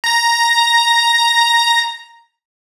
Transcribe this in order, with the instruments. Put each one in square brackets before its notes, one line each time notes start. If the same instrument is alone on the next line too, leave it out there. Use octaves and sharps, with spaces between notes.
[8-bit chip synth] A#5 A#6